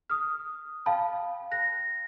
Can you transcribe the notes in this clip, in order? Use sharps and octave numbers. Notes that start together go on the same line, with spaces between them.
D#6 F6
F5 G5 A5 B5
F#6 A#6